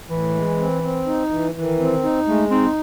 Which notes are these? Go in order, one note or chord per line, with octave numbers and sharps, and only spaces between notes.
A2 E3
G#3
C4
C4
D#4
E3
D#3 E3
C4
D#4
G#3 A3
C4 D#4